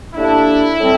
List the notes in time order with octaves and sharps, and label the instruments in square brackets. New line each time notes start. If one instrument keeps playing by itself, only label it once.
[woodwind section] A2 G3 A#3 D4 [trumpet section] E4
[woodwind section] A2 G3 C4